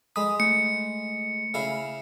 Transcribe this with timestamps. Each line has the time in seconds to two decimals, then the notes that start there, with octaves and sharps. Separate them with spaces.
0.16 G#3 B5 D#6
0.40 A3 C#7
1.54 C#3 E4 F5